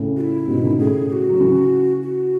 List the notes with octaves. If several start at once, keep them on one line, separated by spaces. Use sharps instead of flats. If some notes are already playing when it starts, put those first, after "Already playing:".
Already playing: A2 C#3
F#4
E4
G#2 B2
B2 D#3
A2 C#3 G#4
G#4
F#4
F#3
C#3 E3
F#4